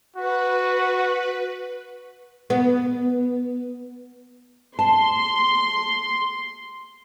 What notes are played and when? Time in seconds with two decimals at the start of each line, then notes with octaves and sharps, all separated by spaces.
0.16 F#4 B4
2.50 B3
4.79 A5 C6